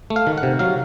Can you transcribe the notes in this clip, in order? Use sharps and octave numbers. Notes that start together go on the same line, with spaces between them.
A3
F5
D#3
F#5
C3
F#3 F5